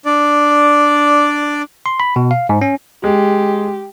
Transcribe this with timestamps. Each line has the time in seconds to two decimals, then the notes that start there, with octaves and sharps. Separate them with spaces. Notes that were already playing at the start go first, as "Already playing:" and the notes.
0.05 D4 D5
1.86 C6
2.00 B5
2.16 B2
2.31 F5
2.49 G#2
2.61 C#4
3.04 G#3 G4